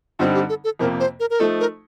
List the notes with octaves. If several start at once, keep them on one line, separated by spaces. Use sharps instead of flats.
G2 D3 G3 C4 D#4 F4
G4
A4
A4
F2 C3 F3 A#3 A#4
C5
A#4
A#4
F3 A3 D#4 A4
A#4